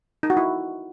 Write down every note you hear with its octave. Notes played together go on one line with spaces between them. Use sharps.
D#4
F#4
E4